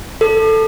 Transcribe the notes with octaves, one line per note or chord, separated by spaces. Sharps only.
A4